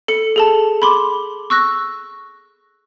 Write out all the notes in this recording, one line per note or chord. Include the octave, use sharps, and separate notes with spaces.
A4 C#7
G#4 A4 A5
B5 C6 D6
C#6 E6 F#6 A#6